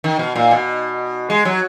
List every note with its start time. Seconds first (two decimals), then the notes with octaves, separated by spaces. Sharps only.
0.04 D#3
0.19 B2
0.36 A#2
0.51 B2
1.30 G#3
1.45 F#3